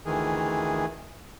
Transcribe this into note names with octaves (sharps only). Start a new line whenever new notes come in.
D2 D#3 E3 G#4